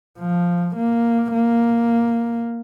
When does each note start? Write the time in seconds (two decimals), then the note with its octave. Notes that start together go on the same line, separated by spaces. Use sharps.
0.19 F3
0.76 A#3
1.34 A#3